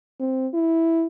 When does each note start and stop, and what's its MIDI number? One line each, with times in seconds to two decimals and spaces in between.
0.20 0.47 60
0.54 1.06 64